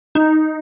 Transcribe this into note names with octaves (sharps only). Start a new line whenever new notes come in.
D#4